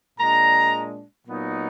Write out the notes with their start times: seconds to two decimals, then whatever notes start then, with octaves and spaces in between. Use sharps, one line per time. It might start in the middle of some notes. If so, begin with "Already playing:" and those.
0.19 A#2 G#3 D4 A#5
1.27 A#2 F#3 B3 D#4